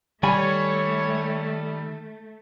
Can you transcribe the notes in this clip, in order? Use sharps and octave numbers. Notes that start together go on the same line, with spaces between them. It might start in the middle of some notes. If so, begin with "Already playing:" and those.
D#3 G3 A3 C#5 G#5 B5